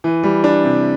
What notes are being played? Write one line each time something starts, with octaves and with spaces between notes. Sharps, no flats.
E3
G3
D4
C3